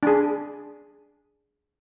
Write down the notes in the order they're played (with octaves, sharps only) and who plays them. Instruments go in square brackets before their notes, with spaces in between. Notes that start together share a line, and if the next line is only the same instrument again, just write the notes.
[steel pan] D4 G#4